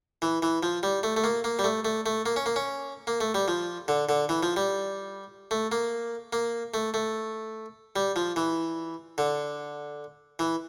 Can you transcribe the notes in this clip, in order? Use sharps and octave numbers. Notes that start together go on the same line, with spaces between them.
E3
E3
F3
G3
A3
A3
A#3
A#3
G3
A3
A3
A3
A#3
C#4
A#3
C#4
A#3
A3
G3
F3
D3
D3
E3
F3
G3
A3
A#3
A#3
A3
A3
G3
F3
E3
D3
E3